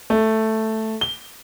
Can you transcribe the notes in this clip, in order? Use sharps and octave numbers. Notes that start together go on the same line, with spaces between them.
A3
G7